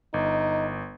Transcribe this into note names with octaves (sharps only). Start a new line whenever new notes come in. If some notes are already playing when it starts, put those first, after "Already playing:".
G1 D#4